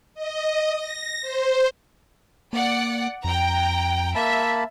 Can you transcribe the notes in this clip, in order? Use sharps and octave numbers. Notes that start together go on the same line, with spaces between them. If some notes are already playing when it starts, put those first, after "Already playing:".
D#5
A#6
C5
A#3 D5 F#5
F2 G5 A#5
A#3 E5 A5 B5